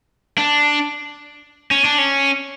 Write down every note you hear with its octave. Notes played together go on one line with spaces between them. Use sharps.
D4
C#4
D4
C#4